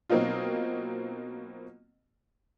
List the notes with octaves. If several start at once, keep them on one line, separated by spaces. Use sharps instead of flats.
B2 F#3 A#3 C4 D#4 F4